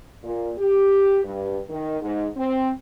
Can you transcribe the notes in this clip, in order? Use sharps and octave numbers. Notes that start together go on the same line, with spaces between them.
A#2
G4
G2
D#3
G#2
C4